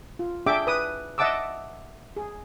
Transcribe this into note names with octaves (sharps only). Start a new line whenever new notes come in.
F4
D4 G#4 E5 G5 D6
B4 D#6
D#5 E5 F#5 A5 D6 E6
G#4